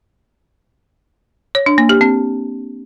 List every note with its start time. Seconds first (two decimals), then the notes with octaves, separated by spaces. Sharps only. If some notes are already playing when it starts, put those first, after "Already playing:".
1.55 C#5
1.66 D4
1.78 A#3
1.89 G4
2.01 C4